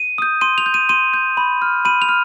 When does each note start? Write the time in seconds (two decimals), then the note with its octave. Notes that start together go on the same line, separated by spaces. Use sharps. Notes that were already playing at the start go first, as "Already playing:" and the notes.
Already playing: D#7
0.18 D#6 G6
0.41 C6 D#7
0.58 F7
0.66 G6
0.74 D#7
0.89 C6 D#7
1.14 G6
1.37 B5
1.62 F6
1.85 B5 D#7
2.02 F7
2.09 F6